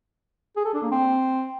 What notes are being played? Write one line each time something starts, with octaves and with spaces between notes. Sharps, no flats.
G#4
A4
D4
A#3
C4